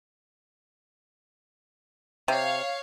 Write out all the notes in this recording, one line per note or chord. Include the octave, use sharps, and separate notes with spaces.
C3 C#5 F5